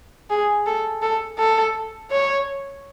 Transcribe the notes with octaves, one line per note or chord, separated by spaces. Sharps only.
G#4
A4
A4
A4
C#5